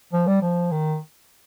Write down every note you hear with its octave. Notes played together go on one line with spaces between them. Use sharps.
F3
G3
F3
D#3